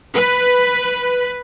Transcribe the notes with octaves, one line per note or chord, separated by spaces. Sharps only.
B4